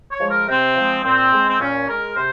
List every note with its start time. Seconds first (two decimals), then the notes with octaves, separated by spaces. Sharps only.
0.11 C#5
0.20 F3 G#3
0.30 A#4
0.48 C3 C4
0.76 F3 G#3
1.05 A#2 C4
1.32 G#3
1.48 C4
1.60 A#2 C#4
1.88 G#3 A#4
2.16 C3 C5